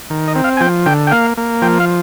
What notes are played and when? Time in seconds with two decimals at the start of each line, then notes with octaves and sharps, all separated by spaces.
0.10 D#3
0.28 D#5
0.35 C4
0.44 F5
0.57 G#5
0.61 F3 G5
0.86 D3 G5
1.07 G5
1.11 A#3 F5
1.37 A#3
1.62 F3 G5
1.80 F5